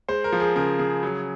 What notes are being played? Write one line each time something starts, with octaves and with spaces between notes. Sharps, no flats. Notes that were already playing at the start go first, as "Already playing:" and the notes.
G#3 C5
A#4
F3
G#4
C#3 A#4
C#3 G#4
F#3